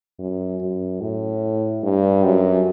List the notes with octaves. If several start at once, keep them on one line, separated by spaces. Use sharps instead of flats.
F#2
F#2
A2
G2
F#2